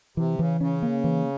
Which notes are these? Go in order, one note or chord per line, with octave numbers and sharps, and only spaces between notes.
C3 E3
C#3 E3
C#3 C#4
A#3
E3